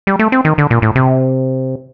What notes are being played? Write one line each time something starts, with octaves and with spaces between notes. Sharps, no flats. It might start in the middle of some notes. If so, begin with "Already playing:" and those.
G3
A3
C4
D#3
D3
A#2
A2
C3